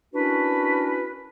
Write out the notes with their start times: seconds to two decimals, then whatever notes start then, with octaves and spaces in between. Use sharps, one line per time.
0.14 C#4 D4 E4 F#4 A#4 B4